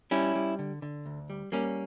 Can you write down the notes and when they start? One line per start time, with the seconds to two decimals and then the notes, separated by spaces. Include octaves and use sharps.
0.11 G3 C#4 E4
0.35 G3
0.59 D3
0.82 D3
1.06 D2
1.30 G3
1.52 G3 A#3 C#4